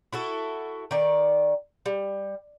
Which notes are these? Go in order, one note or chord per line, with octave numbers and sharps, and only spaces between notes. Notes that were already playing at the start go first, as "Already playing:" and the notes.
E4 F#4 A4
D#3 D5
G3